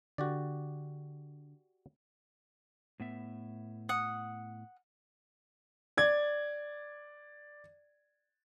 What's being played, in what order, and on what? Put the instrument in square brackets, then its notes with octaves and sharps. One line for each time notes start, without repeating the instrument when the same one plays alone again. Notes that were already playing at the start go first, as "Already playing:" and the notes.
[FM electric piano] D3 [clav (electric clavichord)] F#4 G4 D5
[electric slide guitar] A2 B3 E5
[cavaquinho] F#5 D#6
[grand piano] D5 G#6